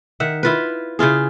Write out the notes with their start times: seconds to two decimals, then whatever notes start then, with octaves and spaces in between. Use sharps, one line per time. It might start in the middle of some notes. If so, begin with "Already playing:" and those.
0.20 D#3 E5 F#5
0.43 E4 F4 B4
0.99 C#3 E4 F4 G#4